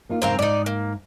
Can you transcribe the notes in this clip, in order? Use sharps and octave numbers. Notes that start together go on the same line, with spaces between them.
A#3 D#4 F4
E2 G#2 C#3 C4 A#4 F5
G#2 D#4 D5
A#3